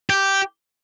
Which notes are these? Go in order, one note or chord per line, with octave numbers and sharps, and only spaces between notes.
G4